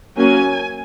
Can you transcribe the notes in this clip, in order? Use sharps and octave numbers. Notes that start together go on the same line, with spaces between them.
F#3 A#3 C#4 G#5